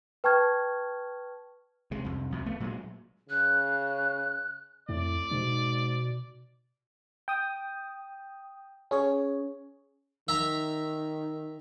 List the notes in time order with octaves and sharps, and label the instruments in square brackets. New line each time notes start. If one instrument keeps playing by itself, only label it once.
[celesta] B4 G5 A5 C#6 F6 G#6
[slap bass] C3 G#3
C2 F2
C2 F2 A2
A3 B3
A#2 F#3 G#3
[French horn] C#3 [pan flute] F#6
[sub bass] F2 [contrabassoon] A2 [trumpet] D5
[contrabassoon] G#2 [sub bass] B2
[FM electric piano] G5 D#6
C#4 G#4 C#5
[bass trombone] D#3 [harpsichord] E5 A#5